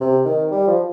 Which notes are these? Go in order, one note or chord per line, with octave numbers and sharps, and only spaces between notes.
C3
D#3
G3
F3